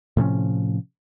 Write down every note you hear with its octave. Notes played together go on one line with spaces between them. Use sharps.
A2 C3 F3 C#4